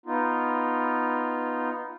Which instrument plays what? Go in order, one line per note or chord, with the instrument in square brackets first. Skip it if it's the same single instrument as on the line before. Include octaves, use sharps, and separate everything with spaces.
[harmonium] B3 D#4 F4